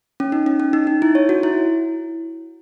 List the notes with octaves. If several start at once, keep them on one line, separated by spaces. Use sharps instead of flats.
C#4
D#4
C#4
C#4
D#4
D#4
E4
C#5
F#4
E4